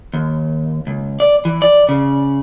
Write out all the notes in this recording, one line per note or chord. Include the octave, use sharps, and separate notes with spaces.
D#2
C#2
D5
E3
D5
C#3